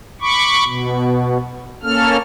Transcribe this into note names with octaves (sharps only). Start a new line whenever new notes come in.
B5 C#6 D6
B2
A#3 C#4 A4 F6